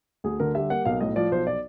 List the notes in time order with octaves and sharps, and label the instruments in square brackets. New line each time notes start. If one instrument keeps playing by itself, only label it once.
[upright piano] D2 G#4
D3 A#4
G3 E5
A#3 F#5
B1 F5
A2 D#5
F3 D5
B1 C5
D5